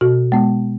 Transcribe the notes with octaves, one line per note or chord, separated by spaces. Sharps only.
B2 F#4
G#3 B3